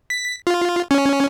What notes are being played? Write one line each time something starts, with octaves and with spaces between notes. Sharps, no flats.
B6
F4
C#4